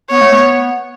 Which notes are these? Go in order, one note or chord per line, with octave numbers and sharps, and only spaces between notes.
B3 C#5
A3
B3